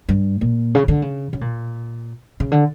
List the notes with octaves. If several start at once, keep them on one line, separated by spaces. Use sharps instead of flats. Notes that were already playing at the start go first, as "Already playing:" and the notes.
G2
A#2
C#3
D3
C#3
C#3
A#2
C#3
D3